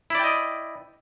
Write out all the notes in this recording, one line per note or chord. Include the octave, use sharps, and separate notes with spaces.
E4 D5 D#5 G5